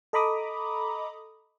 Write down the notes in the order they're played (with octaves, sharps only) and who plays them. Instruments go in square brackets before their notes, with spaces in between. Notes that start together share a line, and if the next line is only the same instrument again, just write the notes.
[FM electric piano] A4 D#5 A#5 B5 D6 D#6